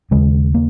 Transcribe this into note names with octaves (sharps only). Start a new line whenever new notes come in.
D#2 C#3 G#3
A#3